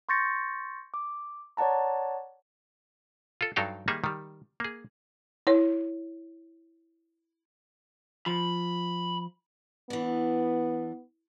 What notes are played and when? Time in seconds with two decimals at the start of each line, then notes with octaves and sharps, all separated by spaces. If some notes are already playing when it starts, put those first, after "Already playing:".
0.09 C6 C#6 G6 A6 A#6 C#7
0.94 D6
1.57 C#5 D5 F#5 A5 A#5
3.41 F4 A4
3.56 G2 F#3 D#4 A4 F5 G5
3.88 D#3 G3 A#3 D#4 G#4 E5
4.04 D#3 G3
4.60 A#3 G#4
5.47 E4 C#5
8.26 F3 B5
9.90 E3 B3 D4